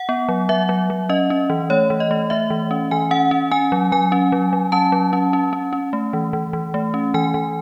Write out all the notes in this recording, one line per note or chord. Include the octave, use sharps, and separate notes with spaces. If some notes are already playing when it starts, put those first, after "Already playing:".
Already playing: F#5
B3
F#3
F#3 E5
F#3
F#3
C#4 D#5
C#4
E3
A3 C#5
E3
D#5
A3
A3 E5
E3
C#4
E3 G#5
C#4 F#5
C#4
C#4 G#5
F#3
F#3 G#5
C#4
F#3
F#3
C#4 A5
F#3
C#4
C#4
C#4
C#4
A3
E3
E3
E3
A3
C#4
E3 G#5
E3